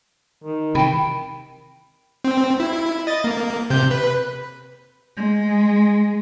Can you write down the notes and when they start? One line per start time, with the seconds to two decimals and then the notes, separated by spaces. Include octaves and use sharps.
0.44 D#3
0.75 C3 E3 G5 B5
2.24 C4
2.60 E4
3.07 D#5 A6
3.24 A#3
3.70 C3 G6
3.91 B4
5.17 G#3